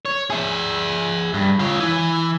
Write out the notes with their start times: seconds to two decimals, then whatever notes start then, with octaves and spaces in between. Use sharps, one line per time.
0.05 C#5
0.30 G#4 E5
1.34 G2
1.59 F4 C#5
1.80 E3